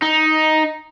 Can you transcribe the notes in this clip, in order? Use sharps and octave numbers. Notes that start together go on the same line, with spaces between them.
D#4